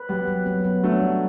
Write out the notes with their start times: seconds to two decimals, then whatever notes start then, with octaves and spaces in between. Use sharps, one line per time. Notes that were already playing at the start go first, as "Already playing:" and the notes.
Already playing: B4
0.09 F#3 G3 B3
0.27 F#3
0.46 B3
0.65 B3
0.83 F#3 A3 D4
1.02 G3